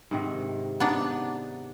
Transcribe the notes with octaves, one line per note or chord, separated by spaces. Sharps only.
G#2 C3 D#3
B3 D4 D#4